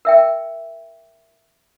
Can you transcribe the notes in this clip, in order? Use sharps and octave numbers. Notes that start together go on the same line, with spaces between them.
A#4 E5 G5